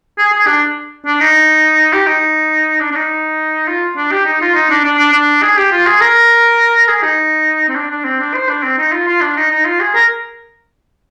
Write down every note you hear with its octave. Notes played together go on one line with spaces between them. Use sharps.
G#4
G#4
D4
D4
D#4
G4
D#4
D4
D4
D#4
F4
D4
G4
D#4
F4
D#4
D4
D4
D4
D4
G#4
G4
F4
G#4
A#4
G#4
D#4
C4
D4
D4
C4
D4
C5
D4
C4
D#4
F4
F4
D4
D#4
D#4
F4
G#4
A#4